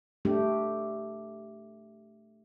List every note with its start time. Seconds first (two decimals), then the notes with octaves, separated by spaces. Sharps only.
0.25 G3 A3 D4 G4